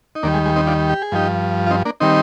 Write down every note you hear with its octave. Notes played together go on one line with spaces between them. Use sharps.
D#4
D#2 D#3 G3 A#3 D4
G#3
G#3
C4 D#4
D4 F4
G4
G#4
G2 F3 D#4 G4
F4
C4 D#4
A#3 D4
D#3 G3 C4 D#4